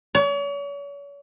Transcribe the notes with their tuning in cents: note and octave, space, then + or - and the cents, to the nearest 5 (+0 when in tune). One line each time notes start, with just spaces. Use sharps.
C#5 +40